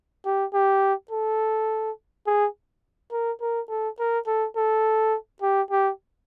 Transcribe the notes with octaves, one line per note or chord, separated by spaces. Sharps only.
G4
G4
A4
G#4
A#4
A#4
A4
A#4
A4
A4
G4
G4